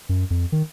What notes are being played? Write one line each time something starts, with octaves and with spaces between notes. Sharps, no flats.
F#2
F2
D#3